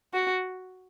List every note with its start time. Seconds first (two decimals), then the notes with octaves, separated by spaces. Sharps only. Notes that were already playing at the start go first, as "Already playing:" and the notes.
0.14 F#4